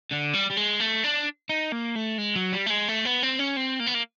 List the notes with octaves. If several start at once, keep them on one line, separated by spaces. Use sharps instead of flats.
D3
G3
G3
G#3
A3
D4
D#4
A#3
A3
G#3
F#3
G3
A3
G#3
A3
B3
C4
C#4
C4
A#3
B3
A#3